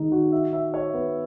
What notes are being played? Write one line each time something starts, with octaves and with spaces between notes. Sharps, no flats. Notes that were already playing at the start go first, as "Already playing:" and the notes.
Already playing: D#3 G#3 D#4
F#4
E5
E5
C#5
B3